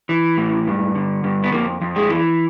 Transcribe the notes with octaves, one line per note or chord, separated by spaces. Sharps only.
E3
A2
G2
D3
G2
B3
F2 A#3
F2
G#3
E3